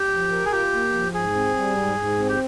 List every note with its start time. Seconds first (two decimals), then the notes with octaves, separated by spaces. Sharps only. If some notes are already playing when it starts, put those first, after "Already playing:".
Already playing: G4
0.10 F3
0.31 A#4
0.45 G#4
0.51 F4 G4
0.73 A#3
0.94 F3
1.14 G#2 G#4
1.35 C4
1.56 G3
1.77 G#2
1.98 G#2
2.19 C4
2.29 G4